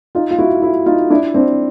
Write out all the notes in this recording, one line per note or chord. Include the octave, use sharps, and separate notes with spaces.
D#4 F4
F4
E4 F#4
E4 F#4
D#4 F4
D4 E4
C4 D4